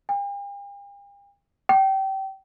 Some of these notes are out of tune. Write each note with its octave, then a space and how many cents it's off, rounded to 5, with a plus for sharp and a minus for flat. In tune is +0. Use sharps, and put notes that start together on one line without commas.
G5 +45
G5 -25